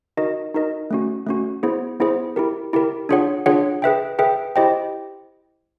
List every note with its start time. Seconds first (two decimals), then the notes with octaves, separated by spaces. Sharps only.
0.17 D#4 F#4 A#4 D#5
0.54 D#4 F#4 A#4 D#5
0.91 A3 C#4 F#4
1.27 A3 C#4 F#4
1.63 B3 E4 G#4 C5
2.00 B3 E4 G#4 C5
2.36 E4 G4 A#4
2.73 E4 G4 A#4
3.09 D4 F4 G#4 C#5 F#5
3.46 D4 F4 G#4 C#5 F#5
3.82 G#4 B4 E5 G5
4.19 G#4 B4 E5 G5
4.56 E4 G4 C5 D#5 G5